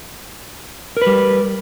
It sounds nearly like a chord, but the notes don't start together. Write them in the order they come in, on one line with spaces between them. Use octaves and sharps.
A#4 B4 G3